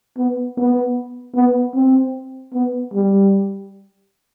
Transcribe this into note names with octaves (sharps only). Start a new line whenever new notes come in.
B3
B3
B3
C4
B3
G3